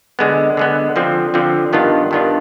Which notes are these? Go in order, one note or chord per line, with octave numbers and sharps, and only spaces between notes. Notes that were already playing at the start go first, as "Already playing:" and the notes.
D3 G#3 B3
D3 G#3 B3
D3 F3 C4
D3 F3 C4
G2 D#3 B3 D4 F4
G2 D#3 B3 D4 F4